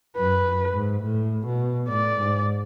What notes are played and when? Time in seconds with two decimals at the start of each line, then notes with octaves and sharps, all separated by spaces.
0.17 F#2 B4
0.45 F#2
0.74 G#2
1.03 A2
1.46 B2
1.90 A2 D5
2.18 G#2